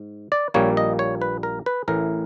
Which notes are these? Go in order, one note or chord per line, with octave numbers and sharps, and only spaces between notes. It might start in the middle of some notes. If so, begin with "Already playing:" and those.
Already playing: G#2
D5
A#1 A#2 G3 A#3 C#5
D#5
C#5
B4
A#4
B4
A1 A2 E3 A#4